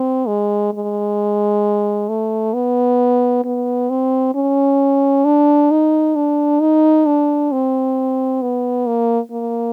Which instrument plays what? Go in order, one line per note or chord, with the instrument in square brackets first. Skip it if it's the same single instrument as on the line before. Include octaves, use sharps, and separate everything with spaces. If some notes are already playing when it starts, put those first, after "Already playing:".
Already playing: [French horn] C4
G#3
G#3
A3
B3
B3
C4
C#4
D4
D#4
D4
D#4
D4
C4
B3
A#3
A#3